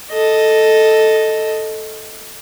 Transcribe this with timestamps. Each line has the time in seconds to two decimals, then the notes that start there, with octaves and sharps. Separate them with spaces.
0.12 A4 D#5